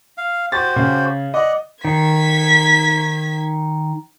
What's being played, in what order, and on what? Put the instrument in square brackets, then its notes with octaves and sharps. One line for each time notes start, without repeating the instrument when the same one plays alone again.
[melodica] F5
[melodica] F#4 G4 C5 [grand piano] A6
[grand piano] C#3
[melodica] D5 F#5 [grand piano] D#5
[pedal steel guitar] D#3 [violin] G#6 B6